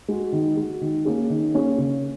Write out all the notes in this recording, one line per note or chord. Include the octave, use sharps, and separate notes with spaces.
G#3 F#4
D#3
G#3 F#4
D#3
A#3 C#4 G#4
D#3
A#3 C#4 G#4
C#3